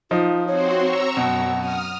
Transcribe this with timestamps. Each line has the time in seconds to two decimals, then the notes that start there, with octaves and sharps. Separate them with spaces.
0.11 F3 D#4 F4
0.47 C4 F#4 C5 C#5
0.81 A#5 C#6 E6
1.17 F#2 B2 F#5
1.57 D#6 F6